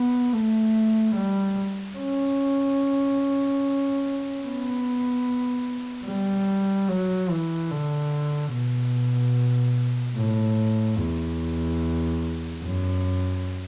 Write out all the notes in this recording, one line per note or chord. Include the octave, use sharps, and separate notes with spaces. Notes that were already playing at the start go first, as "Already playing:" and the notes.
Already playing: B3
A3
G3
C#4
B3
G3
F#3
E3
D3
B2
A2
E2
F#2